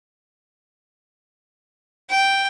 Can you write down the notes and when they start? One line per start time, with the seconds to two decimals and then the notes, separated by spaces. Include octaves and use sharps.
2.10 G5